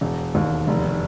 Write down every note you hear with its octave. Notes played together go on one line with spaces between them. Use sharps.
E1
D#2
F1